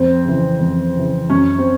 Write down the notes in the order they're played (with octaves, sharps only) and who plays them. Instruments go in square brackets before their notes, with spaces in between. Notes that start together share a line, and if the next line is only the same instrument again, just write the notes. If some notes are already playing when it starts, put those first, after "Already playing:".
Already playing: [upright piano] F2 C4
C#3 E3
F2
C#3 E3
F#2 C#4
C4